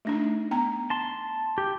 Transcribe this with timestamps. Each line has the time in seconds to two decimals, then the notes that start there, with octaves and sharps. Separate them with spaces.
0.05 A3 D4 D#4
0.51 B3 A#5
0.90 A5 C6
1.58 G4